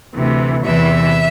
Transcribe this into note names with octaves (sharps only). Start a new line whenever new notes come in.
D2 C3 E3
E2 C3 E3 E5